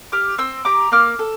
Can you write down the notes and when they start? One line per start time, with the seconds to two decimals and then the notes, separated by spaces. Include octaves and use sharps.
0.12 G4 D6 F6
0.38 C4 C6 E6
0.65 G4 A#5 D6
0.92 A#3 D6 F6
1.19 A4